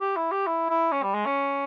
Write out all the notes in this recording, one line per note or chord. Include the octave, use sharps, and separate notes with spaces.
G4
E4
G4
E4
E4
C#4
G3
G#3
C#4